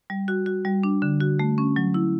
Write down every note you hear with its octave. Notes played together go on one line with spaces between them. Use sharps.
G3
F#4
F#4
G3
D4
D3
F#4
A3
C#4
F#3
E4